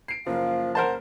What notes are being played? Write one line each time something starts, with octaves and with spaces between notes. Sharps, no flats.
C7 D7
F#1 F3 A#3 F5
A#4 C5 F#5 A5